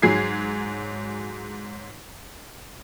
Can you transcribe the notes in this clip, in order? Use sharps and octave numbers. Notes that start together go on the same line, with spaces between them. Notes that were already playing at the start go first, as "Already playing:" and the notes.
G#2 F#3 G#4 G#6 C7